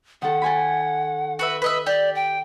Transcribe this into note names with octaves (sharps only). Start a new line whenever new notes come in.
D#3 A4 F#5
A4 G#5 B5
F#4 B4 E5
B4 D#5 E5
G4 D5
G5